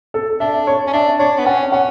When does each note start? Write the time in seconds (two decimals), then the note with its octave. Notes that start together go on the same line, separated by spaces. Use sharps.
0.14 A4
0.40 D4 E5
0.67 C#5
0.87 C#4
0.93 D4 E5
1.19 D4 C#5
1.38 B3
1.46 C#4 F#5
1.72 C#4 F#5